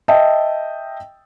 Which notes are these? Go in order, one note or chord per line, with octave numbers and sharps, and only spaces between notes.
D#5 E5 G5 A5